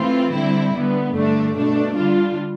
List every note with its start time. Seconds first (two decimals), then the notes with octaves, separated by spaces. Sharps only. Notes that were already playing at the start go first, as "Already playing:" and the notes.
Already playing: E3 A3 C4 F4
0.32 D3 G3 C4 E4
0.73 D3 G3 B3
1.14 G2 D3 A3 D4
1.55 B2 A3 D4
1.95 D3 G3 D4 F4